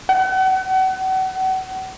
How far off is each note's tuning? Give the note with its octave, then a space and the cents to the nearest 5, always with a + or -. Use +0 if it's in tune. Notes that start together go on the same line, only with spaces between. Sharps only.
F#5 +35